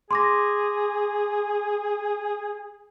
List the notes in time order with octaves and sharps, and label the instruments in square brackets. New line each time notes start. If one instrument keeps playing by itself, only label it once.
[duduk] G#4 [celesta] C6 D6 A#6